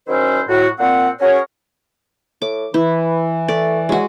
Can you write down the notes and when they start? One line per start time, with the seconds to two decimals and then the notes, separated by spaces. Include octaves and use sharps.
0.08 D#3 F#3 C#4 E4 C5
0.49 A2 F#4
0.79 A#2 C4 F#5
1.21 C#4 F#4 G#4 A#4 C#5
2.42 A2 D6
2.74 E3 E4 B4
3.48 A3 D5
3.89 F#3 G#3 F#4